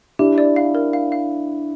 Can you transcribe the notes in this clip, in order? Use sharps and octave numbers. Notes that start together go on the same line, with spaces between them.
D4 E4 G4
D5
F5
A#4
F5
F5